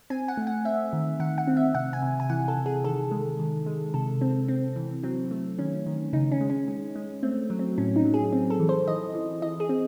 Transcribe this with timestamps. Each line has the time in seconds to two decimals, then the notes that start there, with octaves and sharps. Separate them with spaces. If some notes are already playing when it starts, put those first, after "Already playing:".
0.10 C4 G#5
0.28 F#5
0.37 A3
0.47 F#5
0.65 C4 E5
0.93 D#3
1.20 D#3 F#5
1.38 F#5
1.47 C4
1.57 E5
1.75 C3 F#5
1.93 G#5
2.02 C3
2.20 G#5
2.30 E3 F#5
2.48 A4
2.57 C3
2.66 G#4
2.84 D#3 A4
3.11 G#3
3.39 D#3
3.66 G#3
3.94 C3 A4
4.21 C4
4.48 C4
4.76 E3
5.03 F#3 C4
5.31 A3
5.59 D#3 C#4
5.86 D#3
6.13 C#3 D#4
6.32 C#4
6.41 G#3
6.50 C#4
6.68 G#3
6.95 G#3
7.23 A3 C4
7.50 F#3
7.59 C4
7.78 A2 C#4
7.96 D#4
8.05 F#3
8.14 G#4
8.32 C4
8.50 A4
8.60 E3
8.69 C5
8.87 E3 D#5
9.15 E3
9.42 E3 D#5
9.60 G#4
9.69 C4